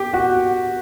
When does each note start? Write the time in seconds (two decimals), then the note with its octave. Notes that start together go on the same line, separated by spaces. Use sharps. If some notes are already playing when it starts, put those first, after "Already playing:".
Already playing: G4
0.13 F#4